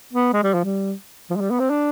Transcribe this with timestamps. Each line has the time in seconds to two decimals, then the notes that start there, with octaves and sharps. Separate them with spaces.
0.13 B3
0.33 G#3
0.43 G3
0.54 F3
0.64 G3
1.30 F3
1.37 G#3
1.41 G3
1.51 B3
1.60 C4
1.70 D4